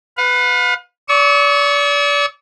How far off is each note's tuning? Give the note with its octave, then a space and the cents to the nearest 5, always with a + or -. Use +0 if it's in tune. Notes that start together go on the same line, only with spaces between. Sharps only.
B4 +10 F5 +40
D5 -35 C#6 +0 E6 -45